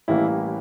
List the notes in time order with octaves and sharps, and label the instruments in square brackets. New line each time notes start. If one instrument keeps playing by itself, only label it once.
[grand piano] A1 A2 E3 G3 A#3 E4